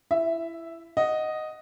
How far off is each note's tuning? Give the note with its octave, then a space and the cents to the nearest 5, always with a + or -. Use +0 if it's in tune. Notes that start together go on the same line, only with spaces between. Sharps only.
E4 +20 E5 +0
D#5 +0 F#5 +0